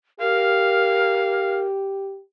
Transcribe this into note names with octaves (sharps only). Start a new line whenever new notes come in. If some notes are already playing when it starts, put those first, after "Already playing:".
G4 A#4 F5